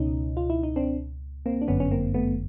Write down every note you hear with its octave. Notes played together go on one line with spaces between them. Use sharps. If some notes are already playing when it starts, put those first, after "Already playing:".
Already playing: C#2 B2 C#4 D#4
F4
E4
D#4
C4 D4
A#3 C4
D4
G1 F#2 D3 B3 C#4
C#4
A#3 C4
A3 B3